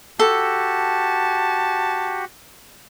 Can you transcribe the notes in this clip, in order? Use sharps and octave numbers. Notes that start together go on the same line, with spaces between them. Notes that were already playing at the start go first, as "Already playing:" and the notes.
F#4 G4 A4 A5